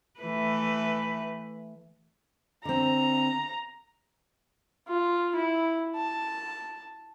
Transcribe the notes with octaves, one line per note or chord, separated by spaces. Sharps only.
E3 A3 B4
D3 C4 A#5
F4
E4
A5